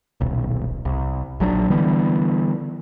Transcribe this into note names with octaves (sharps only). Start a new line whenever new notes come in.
D#1 B1
C2
A#1 F#3 G3 D4
D3 E3 G3 B3